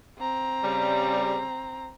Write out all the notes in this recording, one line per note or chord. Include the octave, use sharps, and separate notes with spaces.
C4 A#5
C#3 G3